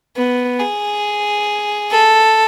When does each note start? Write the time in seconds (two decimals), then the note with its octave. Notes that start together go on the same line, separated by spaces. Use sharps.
0.17 B3
0.60 G#4
1.92 A4